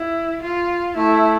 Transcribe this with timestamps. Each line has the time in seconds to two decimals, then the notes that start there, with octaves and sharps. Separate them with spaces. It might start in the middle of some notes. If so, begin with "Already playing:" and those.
Already playing: E4
0.43 F4
0.96 A3 E4